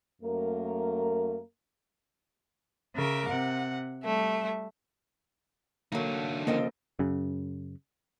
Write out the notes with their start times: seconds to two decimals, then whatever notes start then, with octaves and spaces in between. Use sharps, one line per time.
0.22 F#2 A3 A#3 A#4
2.96 C#3 A#4 E5 D6
3.27 C3 F#5
4.03 G3 A3 E5
5.92 D3 F#3 A3 A#3 D#4
6.47 C#3 F3 A#3 C4 A4 D#5 G5
6.99 F#2 C#3